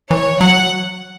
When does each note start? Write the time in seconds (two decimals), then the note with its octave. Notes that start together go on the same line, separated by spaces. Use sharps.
0.11 E3 C#5
0.40 F#3 F#5